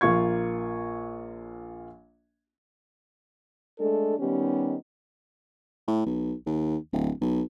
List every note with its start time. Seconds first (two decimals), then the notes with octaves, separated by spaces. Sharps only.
0.01 A#1 A#3 F4 C#6 G#6
3.80 G#3 A3 D4 A4
4.19 D#3 G3 B3 C#4 D#4 G4
5.88 A2
6.06 B1
6.46 D#2
6.93 D1
7.21 B1